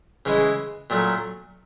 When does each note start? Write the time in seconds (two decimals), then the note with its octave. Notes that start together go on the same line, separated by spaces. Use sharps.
0.25 C#3 E3 G#3
0.90 A#2 F#3 A3